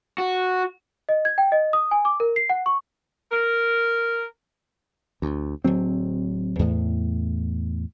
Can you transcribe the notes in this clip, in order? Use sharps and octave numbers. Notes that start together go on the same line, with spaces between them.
F#4
D#5
G#6
G5
D#5
D#6
G#5
D6
A#4
C7
F#5
C#6
A#4
D2
D1 C#2 F#3 C4
E2 A2